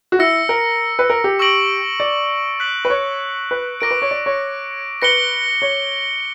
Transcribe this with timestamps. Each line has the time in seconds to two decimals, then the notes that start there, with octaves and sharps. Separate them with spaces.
0.12 F#4
0.19 E4 E6 A#6 C#7
0.49 A#4
0.99 B4
1.10 A#4
1.24 G4
1.39 C#6 E6 A#6 D7 F#7
2.00 D5
2.60 F#6 B6 F#7
2.85 B4
2.90 C#5
3.51 B4
3.81 A#4 D6 A#6 D7
3.91 B4
4.02 C#5
4.11 D5
4.26 C#5
5.02 B4 A#6 C#7 G7
5.62 C#5